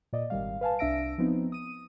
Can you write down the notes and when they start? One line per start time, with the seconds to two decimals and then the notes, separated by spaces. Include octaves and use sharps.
0.13 A#2 D5 D#5
0.30 G#1 D#3 G3 F5
0.61 B4 F5 G#5 A5
0.79 C2 D4 E5 E6 A#6 D7
1.18 F3 B3 C4 D#4
1.52 D#6 D#7